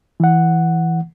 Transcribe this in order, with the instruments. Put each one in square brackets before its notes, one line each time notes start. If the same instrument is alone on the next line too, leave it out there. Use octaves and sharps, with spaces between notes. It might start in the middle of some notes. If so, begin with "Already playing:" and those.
[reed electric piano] E3 F#5